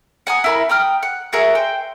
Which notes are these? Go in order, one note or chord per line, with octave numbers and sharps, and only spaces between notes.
F#5 G#5 A#5 D#6
E4 A#4 B5
G5 A#5 D#6 F6
F#5
F#4 G#4 A#4 E5
C5 G5